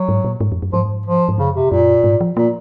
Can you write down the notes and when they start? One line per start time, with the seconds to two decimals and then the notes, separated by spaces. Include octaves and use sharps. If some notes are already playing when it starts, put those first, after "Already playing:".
Already playing: F#3
0.09 G#2
0.24 A#2
0.41 G#2
0.52 F2
0.62 F#2
0.73 G#2 F3
1.06 F3
1.29 G#2
1.38 F#2 C#3
1.55 C3
1.71 F#2 A#2
2.04 G#2
2.21 F3
2.37 A#2 A#3